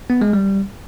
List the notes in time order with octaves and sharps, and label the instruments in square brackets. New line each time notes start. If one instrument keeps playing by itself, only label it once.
[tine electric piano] B3
G#3
G3